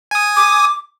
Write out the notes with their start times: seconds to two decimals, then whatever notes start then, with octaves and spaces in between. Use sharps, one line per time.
0.11 G#5 D#6
0.36 D6